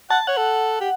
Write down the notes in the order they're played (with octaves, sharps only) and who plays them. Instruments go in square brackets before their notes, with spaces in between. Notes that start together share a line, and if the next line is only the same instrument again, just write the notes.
[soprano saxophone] F#5 [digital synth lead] A5
[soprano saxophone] C#5 [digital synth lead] F#5
[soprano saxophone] A4
G4